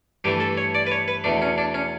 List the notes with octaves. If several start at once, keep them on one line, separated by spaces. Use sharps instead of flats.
G2 E3 A3 G4
A4
C#5
D5
B4
C#5
B4
E2 B2 A3 D4
C#4
D4
C#4